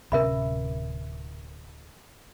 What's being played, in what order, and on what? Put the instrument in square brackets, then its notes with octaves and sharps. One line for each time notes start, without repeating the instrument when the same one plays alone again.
[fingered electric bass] D1 C3 C#4 [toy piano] A#4 E5 B5